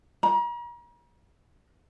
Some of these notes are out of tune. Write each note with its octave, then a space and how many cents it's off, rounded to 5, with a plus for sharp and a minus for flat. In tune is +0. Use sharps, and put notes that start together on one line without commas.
A#5 +40